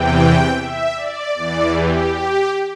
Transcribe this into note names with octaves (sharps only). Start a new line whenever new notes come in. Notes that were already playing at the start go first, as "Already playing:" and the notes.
Already playing: E2 C3 E3 G5
E5
D5
E2 E3 D5
G4
G4